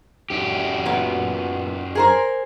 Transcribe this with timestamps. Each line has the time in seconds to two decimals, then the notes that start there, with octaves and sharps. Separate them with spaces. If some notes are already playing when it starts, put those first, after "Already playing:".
0.30 F#2 G4
0.86 A#2 B3
1.95 G#4 A#4 C5